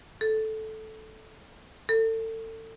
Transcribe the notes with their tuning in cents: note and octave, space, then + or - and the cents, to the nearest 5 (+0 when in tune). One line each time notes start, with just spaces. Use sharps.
A4 -10
A4 +30